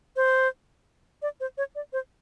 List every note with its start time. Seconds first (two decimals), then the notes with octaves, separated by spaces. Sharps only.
0.16 C5
1.22 D5
1.40 C5
1.58 C#5
1.75 D5
1.93 C5